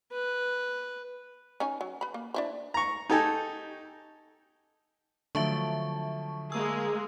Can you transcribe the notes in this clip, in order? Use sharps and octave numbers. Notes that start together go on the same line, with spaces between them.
B4
C#4 D#4 G#5
F#3
B4 B5
A#3
D4 E4 C5
A#5 C#6
D#4 G4 A4 G#5
D3 F3 F#3 A3 E5 A5 C#6
G#3 A#3 G#4 E6